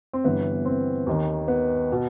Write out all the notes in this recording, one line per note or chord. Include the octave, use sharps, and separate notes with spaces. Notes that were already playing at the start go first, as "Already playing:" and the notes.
C4
G1 G2 E3 B3
C4
D#2 D#3
B3
B2